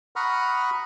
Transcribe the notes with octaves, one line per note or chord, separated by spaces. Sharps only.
F#5 A#5 B5 C#6 D#6 F6